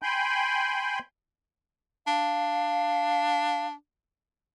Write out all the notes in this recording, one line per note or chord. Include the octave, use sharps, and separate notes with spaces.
G5 G#5 B5 C6 G6
D4 F5